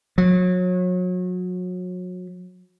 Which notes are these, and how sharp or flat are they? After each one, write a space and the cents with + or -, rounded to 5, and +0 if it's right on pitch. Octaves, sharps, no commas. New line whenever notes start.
F#3 -30